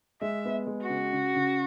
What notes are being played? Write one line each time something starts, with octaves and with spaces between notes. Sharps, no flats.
G#3 E5
B3
G#3
F#4
C#3
C#3
C#3